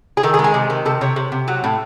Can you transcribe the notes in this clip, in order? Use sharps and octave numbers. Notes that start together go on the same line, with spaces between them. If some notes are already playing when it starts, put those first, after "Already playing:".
G#4
D#3 A4
G#4
G#3
G#4
C3
D#3
C3 A4
C3 C#5
C3
C3
F#3
A2